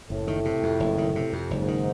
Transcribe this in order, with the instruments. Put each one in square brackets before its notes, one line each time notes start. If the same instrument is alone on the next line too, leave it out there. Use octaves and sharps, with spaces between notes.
[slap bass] F#1 [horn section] A2
[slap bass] D#3
C3
F2
F#1
D#3
C3
F2
[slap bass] F#1 [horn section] G#2
[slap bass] D#3